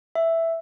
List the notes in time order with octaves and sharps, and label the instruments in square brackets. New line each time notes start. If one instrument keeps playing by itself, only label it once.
[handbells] E5